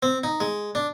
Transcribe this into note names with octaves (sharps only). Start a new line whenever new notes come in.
C4
D#4
G#3
D4